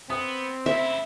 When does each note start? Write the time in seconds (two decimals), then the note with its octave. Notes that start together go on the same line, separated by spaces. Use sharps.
0.10 B3 C4 D#6
0.66 C#3 E4 E5